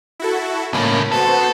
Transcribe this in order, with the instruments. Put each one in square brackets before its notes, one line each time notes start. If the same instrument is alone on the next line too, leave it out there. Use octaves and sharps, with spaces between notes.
[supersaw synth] E4 F#4 A4
[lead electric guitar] C#2 A2 [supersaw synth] A#3 C#4
[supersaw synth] B3 F#4 C5 [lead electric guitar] A4